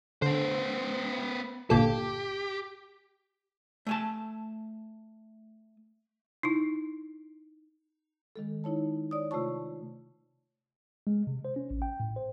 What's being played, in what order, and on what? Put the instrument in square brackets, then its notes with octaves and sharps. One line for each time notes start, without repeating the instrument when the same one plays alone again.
[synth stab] D3 [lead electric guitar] B3 C5
[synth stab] G1 A#2 A4 [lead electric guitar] G4
[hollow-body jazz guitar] A3 G#5 A5
[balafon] D#4 E4
[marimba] D#3 G#3 A4
D#4 E4 C#5 A5
C#5 D5 D#6
C3 A3 F4 C#5 A5 C#6
[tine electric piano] G#3
C3
C5
C#4
A1
G5
A2
C5